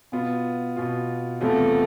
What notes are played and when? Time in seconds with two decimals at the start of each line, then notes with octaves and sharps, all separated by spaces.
0.12 B2 B3 F4
0.77 B2 B3 F4
1.41 E2 C3 F3 A3 B3 F4